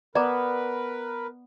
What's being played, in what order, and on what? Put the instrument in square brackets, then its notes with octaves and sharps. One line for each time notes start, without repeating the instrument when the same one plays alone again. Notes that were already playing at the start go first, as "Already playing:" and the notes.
[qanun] B3 [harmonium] A#4 B4 [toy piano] D5 A#5 D6